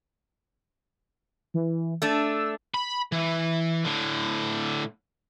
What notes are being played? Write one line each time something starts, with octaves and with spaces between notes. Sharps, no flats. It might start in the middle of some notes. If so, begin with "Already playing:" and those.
E3
A3 D4 E6
B5
E3
A2 D3